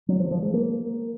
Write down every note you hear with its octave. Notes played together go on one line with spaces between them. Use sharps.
F#3
F3
F3
G#3
A#3